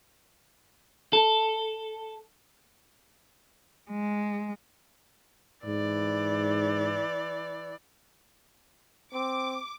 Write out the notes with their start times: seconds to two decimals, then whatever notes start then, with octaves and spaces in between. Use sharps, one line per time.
1.13 A4
3.91 G#3
5.66 G#2 E3 D5
9.13 C4 D6